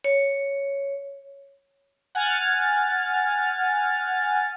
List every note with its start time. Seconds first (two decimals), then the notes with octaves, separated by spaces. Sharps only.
0.04 C#5
2.15 F#5 G#5 F6 A6